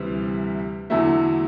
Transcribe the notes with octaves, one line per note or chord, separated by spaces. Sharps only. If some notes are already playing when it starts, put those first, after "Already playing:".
Already playing: D2 C3 E3 G3
E2 D3 F#3 A3 E4